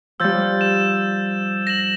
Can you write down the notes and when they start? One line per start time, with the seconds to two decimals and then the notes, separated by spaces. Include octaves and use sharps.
0.20 F3 G3 E6 G6 A6
0.61 E7
1.67 A#6 E7 F#7